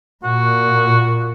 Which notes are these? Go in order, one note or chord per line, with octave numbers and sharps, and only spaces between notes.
A#2 F#4